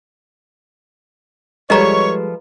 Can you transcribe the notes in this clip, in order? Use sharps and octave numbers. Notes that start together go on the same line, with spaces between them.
F3 G3 G#3 A4 B4 C#5 D#5 A#5